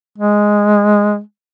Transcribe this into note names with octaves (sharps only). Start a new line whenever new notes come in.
G#3